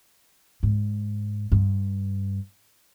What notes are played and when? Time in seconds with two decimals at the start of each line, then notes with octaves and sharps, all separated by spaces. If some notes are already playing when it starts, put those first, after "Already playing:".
0.63 G#2
1.52 G2